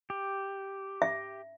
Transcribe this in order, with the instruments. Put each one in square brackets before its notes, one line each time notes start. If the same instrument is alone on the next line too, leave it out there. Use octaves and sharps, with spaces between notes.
[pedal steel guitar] G4
[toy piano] E5